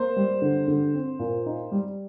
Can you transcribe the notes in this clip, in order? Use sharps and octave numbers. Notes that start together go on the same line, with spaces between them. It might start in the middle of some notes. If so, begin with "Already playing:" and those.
Already playing: A#3 C5
G3
D3
D3
C4
A#2
D#4
G3